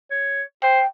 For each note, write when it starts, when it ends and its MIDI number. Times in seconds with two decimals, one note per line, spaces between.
0.11 0.42 73
0.63 0.81 72
0.63 0.87 79